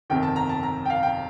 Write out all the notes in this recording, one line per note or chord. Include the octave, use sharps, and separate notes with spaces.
G1 F2 C3 D#3 G5
A5
A#5
A5
A#5
G5
F5
G5